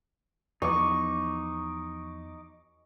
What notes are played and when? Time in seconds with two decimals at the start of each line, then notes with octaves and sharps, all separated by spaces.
0.62 E2 F3 B3 D#4 C#6 D6